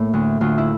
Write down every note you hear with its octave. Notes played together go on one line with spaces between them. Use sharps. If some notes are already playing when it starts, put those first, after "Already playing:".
Already playing: A2 A#3
D2
D2 F4
E4